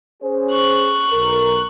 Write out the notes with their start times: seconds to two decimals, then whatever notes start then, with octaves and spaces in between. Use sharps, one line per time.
0.23 C#4 G#4 C5
0.52 C#6 F#6
1.11 B1 A#4